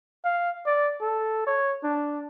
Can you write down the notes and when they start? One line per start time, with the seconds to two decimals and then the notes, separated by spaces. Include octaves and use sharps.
0.25 F5
0.66 D5
1.01 A4
1.47 C#5
1.83 D4